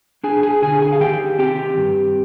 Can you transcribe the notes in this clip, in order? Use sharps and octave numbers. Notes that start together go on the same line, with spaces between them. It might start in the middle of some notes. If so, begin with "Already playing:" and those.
D4 G#4 G#5
G#4 G#5
D3 G#4 G#5
G#4 G#5
F5
D#3 G4 G5
C4 G4 G5
G2